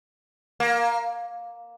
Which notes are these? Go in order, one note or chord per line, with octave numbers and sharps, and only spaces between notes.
A#3